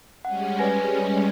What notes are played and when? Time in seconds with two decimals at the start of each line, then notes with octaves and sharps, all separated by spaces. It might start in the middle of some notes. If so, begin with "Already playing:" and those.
0.25 G3 G#3 C#4 F#5
0.59 B4 G#5 A#6